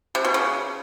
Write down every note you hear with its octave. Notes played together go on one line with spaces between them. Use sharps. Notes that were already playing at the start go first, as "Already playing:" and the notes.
C3
B2
C#3